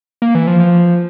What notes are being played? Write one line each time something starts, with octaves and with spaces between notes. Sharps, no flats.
A#3
E3
F3
F3